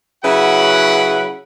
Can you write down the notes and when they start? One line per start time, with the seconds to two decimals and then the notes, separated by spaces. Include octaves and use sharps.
0.23 C#3 F#3 E4 B4 F#5 B5